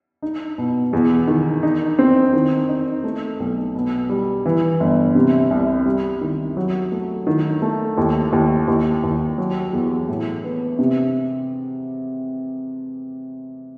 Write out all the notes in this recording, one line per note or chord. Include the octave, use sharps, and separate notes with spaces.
D#4
B2
E2
D#3
D#4
C4
D#3
D#4
A3
B1
B2
G3
E3
G1
C3
C2
G3
D#3
F#3
A3
D#3
A3
D#2
D#2
D#2
D#2
F#3
E2
A2
B3
C3